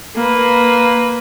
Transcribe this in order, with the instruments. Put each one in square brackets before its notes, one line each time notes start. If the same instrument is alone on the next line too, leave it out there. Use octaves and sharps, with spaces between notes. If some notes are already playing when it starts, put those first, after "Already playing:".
[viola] A#3 B4